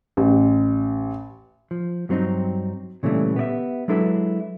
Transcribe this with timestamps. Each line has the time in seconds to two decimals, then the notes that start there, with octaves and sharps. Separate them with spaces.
0.17 A1
1.71 F3
2.09 G2 F#3 C4 D4 D#4
3.03 A#2 C#3 E3 G3 A3 D4
3.36 B3 G4 D5 E5
3.88 F#3 G#3 D4 E4 A4 B4